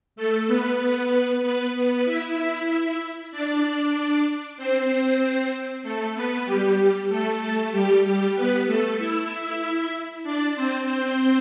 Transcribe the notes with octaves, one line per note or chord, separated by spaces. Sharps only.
A3 A4
B3 B4
B3 B4
B3 B4
B3 B4
E4 E5
D4 D5
C4 C5
A3 A4
B3 B4
G3 G4
A3 A4
A3 A4
G3 G4
G3 G4
B3 B4
A3 A4
E4 E5
D4 D5
C4 C5
C4 C5